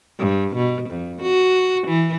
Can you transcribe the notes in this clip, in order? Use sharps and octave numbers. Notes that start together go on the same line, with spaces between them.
G2
B2
F2
F#4
E3